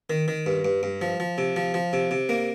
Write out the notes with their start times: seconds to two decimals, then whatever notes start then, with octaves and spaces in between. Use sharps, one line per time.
0.10 D#3
0.28 D#3
0.46 G2
0.65 G2
0.83 G2
1.02 F3
1.20 F3
1.38 C3
1.56 F3
1.74 F3
1.93 C3
2.11 C3
2.29 A#3